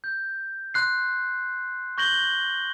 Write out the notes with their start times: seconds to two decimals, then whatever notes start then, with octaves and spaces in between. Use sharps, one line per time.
0.04 G6
0.74 C6 F#6 C7
1.98 C#6 G6 A#6 F#7 G7